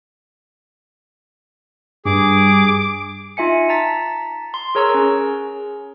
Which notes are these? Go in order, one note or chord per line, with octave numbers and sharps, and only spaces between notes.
G2 G#4 D6
D#4 F4 E5 G#5 C#7
A5 A#5 A6 B6
C6
G#4 A#4 C#5 A#5 C#6 E6
C#4 G#4